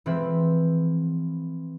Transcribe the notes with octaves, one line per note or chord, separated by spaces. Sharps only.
E3 F3 G#3 C4 B4 E5